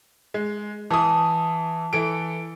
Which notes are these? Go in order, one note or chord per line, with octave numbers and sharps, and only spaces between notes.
G#3
E3 A5 D#6
E3 A4 D7